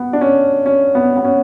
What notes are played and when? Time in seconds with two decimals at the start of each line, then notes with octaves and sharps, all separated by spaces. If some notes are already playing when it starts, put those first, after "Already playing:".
Already playing: B3
0.13 D4
0.21 C#4
0.66 C#4
0.95 B3
1.17 B3
1.24 C#4